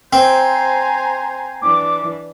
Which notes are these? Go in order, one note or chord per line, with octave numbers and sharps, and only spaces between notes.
C4 C5 G#5 A#5
E3 D4 D6